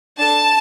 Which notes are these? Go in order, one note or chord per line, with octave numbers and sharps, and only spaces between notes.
D4 A4 A5